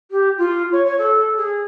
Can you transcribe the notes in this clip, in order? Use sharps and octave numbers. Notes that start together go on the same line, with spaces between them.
G4
F4
C#5
C#5
A4
G#4